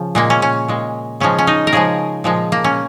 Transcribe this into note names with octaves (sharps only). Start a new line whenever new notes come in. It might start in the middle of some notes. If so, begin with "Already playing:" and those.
Already playing: C#3 F3
A#2 G#3 A#3
C#4
C#4
A#2 G#3
C#3 F3 G#3 C#4
C#4
D#4
A#4
C#3 F3 G#3 G#4
A#2 F3 G#3
A#3
C#4